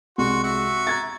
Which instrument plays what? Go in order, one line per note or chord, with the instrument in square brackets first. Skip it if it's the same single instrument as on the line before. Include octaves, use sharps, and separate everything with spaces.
[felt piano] C2 G#3 [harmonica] F#4 C6
[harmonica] F#4 E5
[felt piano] A#5 G#6 A6